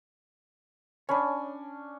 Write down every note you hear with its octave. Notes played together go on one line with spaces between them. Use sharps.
C#4 D4 C#5 B5